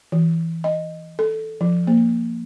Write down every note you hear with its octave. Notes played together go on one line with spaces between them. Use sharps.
E3
D#5
A4
F3
A#3